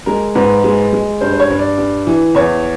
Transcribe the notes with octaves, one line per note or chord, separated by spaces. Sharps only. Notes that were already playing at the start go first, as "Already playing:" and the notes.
G#3 A#4
G#2 B4
G#3
G#3
G2 C5
C5
C#5
G2
D5
G2
E3
E2 C#5